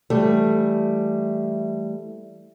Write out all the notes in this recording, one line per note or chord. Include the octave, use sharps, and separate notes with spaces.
E3 G3 A3